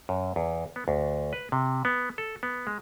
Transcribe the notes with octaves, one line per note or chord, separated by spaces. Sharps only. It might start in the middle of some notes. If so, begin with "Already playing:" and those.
F#2
E2
B3
D2
B4
C3
B3
A4
B3
G#3